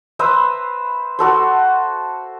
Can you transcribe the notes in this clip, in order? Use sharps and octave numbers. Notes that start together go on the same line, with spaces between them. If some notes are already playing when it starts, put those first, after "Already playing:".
B4 C5 E5 A#5
F#4 A4 C5